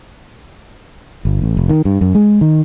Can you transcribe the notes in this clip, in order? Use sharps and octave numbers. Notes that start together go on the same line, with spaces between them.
G1
A1
F1
D#3
G2
F#2
G#3
D#3